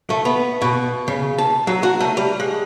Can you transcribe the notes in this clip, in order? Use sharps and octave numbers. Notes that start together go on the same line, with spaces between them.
A3
B3
B2
C#3
A5
F#3
F#4
A3
G3
G#3